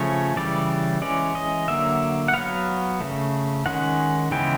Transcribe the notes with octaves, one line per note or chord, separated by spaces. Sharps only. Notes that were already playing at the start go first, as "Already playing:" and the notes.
Already playing: C#3 F3 A3 C#4 C#5
C#3 E3 G3 D5
E3 G#3 C#4 D5
D#5
D3 F#3 A#3 E5
F#5
F#3 B3 F5
C#3 F#3 A3
D#3 G#3 C#4 F#5
C#3 E3 G#3 B3 G5